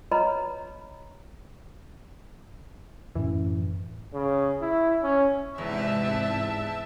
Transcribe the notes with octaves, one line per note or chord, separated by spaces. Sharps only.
B4 C#5 D#5 A#5 B5
F#2 A2 E3 C#4
C#3
E4
C#4
E2 G#2 C3 E5 A5